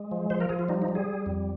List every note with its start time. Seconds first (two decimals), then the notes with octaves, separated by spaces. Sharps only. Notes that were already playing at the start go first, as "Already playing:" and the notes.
Already playing: G#3
0.11 F3
0.30 F3 C5
0.40 A#4
0.49 F3 G#4
0.59 F4
0.69 G3 D#4
0.82 D#4
0.88 G3
0.95 G#4
1.08 G3
1.26 F2